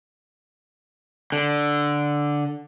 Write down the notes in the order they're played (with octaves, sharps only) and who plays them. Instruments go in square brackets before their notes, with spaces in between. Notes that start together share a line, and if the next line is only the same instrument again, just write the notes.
[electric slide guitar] D3